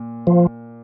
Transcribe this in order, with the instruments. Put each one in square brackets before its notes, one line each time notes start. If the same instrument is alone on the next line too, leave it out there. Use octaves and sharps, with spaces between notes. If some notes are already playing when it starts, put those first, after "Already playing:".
Already playing: [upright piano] A#2
[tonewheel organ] F3